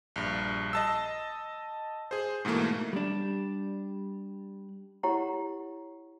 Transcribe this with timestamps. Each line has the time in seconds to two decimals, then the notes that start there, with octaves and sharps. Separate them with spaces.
0.16 A#1 G2
0.73 D#5 A5 E6
2.11 G#4 C5
2.45 G#2 B2 E3 A3 A#3
2.93 G3 D4
5.03 E4 G4 C#5 F#5 A#5